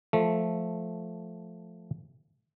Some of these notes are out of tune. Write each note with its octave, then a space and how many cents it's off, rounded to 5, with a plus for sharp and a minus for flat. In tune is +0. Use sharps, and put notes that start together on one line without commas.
F3 +0 A3 -5